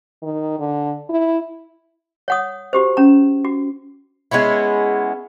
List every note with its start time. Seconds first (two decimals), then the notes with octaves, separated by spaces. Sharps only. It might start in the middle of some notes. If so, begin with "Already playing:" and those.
0.23 D#3
0.59 D3
1.09 E4
2.28 C#5 F#5 D#6
2.73 F#4 G4 C5
2.97 C#4 A#5
3.45 F#4
4.31 G#3 B3 C#4 E4